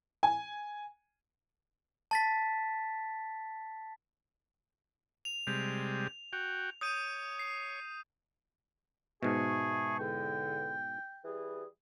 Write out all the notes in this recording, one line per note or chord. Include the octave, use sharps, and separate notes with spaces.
G#5
A5 A6 B6
F7
C3 G3 G#3
F#4 G5
C#5 D#6 G6 D#7
C7
G#2 B2 G#4 E5 A5 C#6
E2 D3 G5
E3 G3 G#4